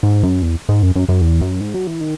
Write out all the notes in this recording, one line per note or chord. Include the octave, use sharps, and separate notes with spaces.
G#2
F#2
E2
G#2
F#2
F#2
F#2
E2
F#2
G#2
F#3
E3
D#3